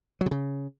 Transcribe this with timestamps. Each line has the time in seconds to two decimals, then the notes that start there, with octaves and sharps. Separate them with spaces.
0.21 F#3
0.26 C3
0.31 C#3